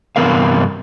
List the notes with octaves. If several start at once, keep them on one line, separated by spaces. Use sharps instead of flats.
G2 C3 E3 B3 A#4 F5